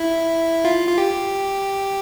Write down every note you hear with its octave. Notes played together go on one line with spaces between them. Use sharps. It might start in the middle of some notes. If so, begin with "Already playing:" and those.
Already playing: E4
F4
F4
G4